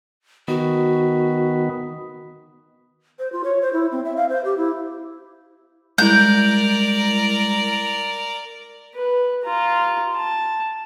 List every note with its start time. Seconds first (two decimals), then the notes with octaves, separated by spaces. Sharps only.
0.48 D#3 B3 F#4
3.19 C5
3.32 F4
3.44 C#5
3.62 C5
3.73 E4
3.92 C4
4.05 E5
4.16 F5
4.29 C5
4.45 G4
4.57 E4
5.98 G3 G#3 E4 A#4 D5 G6
8.95 B4
9.45 F4 A#5
10.17 A5